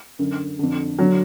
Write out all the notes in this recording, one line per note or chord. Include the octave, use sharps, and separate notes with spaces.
F#2 D3
F2 D3
D3 F#3